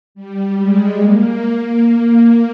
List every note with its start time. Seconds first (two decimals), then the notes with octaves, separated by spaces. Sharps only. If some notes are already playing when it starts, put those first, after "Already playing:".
0.15 G3
0.57 G#3
0.98 A#3
1.83 A#3